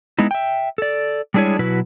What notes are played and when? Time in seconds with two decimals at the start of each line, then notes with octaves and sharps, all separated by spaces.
0.18 G#3 B3 D#4 E4
0.31 E5 G5
0.78 A4 D5
1.34 G3 G#3 D4 E4 G#4 C#5
1.59 B2 F#3 E4 F#4 B4